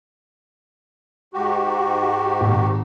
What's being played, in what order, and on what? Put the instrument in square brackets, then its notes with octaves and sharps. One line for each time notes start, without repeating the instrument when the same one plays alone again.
[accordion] G#2 F#4 G4
[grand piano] G#1